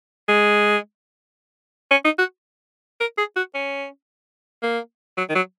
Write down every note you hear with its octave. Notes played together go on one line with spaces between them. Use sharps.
G#3
C#4
D#4
F#4
A#4
G#4
F#4
C#4
A#3
F#3
D#3
F#3